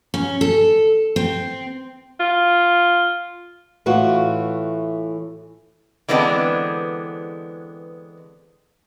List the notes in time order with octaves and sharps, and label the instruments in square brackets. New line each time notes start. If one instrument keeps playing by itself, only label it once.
[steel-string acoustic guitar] C#4
A4
C4
[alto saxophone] F4
[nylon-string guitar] A2 E3 F4 F#4
[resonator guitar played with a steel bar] D3 E3 G#3 B3 C4 D4